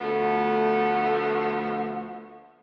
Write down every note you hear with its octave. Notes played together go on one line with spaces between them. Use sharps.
D2 F3 A3 B3